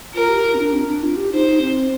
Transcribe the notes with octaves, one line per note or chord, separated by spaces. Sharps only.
F4 A#4
G4
F4
C4
D4
C4
D4
F4
G4
D#4 C5
C4